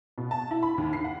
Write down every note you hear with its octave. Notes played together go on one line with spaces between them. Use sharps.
B2
A5
E4
B5
D#2
C7
F#5